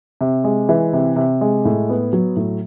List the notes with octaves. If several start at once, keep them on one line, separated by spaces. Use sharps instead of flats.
C3
G#3
E3
C3
C3
G#3
A2
B3
F#3
A2